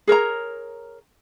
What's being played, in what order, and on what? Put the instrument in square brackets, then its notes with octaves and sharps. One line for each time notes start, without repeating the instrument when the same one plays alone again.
[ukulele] G#4 A#4 C#5 A#5